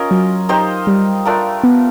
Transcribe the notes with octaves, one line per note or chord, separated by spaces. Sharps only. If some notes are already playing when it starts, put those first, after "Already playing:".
Already playing: C#4 F4 A#4 D#5
F#3
D#4 G4 C5 D#5
G3
A3 D4 F4 A#4
B3